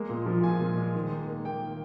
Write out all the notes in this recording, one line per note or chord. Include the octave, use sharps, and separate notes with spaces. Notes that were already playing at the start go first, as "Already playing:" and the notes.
Already playing: G#3 A#3
A#2
F3
A#2 G#5
A#2
G#3
D#3
A#3
A#3
A#3 G5
D#3